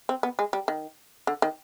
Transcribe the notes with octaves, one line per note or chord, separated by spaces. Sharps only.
C4
B3
G#3
G3
D#3
D3
D#3